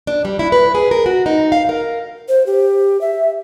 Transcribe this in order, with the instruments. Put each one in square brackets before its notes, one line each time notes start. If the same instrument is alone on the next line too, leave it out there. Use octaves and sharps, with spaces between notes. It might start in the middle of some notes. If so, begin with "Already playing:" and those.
[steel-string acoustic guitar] D4
G3
E4
B4
G#4
A#4
F#4
D#4
F5
A#4
[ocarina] C5
G4
E5